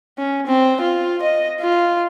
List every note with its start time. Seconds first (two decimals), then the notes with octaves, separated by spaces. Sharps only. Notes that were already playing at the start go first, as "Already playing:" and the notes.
0.18 C#4
0.47 C4
0.81 F4
1.22 D#5
1.61 F4